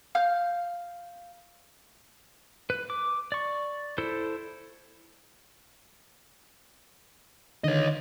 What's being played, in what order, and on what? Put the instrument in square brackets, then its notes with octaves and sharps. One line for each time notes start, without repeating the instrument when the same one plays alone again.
[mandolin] F5 F6 G6
[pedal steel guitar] B4
D6
D5 C#6
E4 A4 C5
[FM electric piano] D3 D#3 [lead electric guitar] C#5 D#5